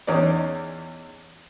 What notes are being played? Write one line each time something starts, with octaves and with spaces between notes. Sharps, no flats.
E2 C#4 D#4 D5